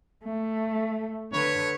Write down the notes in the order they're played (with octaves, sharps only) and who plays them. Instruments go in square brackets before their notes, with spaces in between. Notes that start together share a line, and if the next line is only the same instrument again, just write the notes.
[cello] A3
[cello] D3 B4 [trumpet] C#5